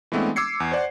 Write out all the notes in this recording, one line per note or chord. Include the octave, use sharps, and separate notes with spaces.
E3 G#3 A3 B3 C4 D4
D6 E6 G#6 C7 C#7
E2
C5 D5 F#5